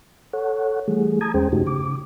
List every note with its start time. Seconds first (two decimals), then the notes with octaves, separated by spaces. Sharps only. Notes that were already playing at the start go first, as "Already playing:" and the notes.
0.33 A4 C#5 F#5
0.88 E3 G3 A3 G#4
1.21 A5 A#5 D#6 G#6
1.34 E2 G#3 C#4 G#4 C5 G5
1.52 G2 C#3 A3 D#4 F#4 G4
1.67 C#3 D6